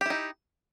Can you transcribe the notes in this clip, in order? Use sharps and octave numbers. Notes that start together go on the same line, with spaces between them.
D#4 E4 G4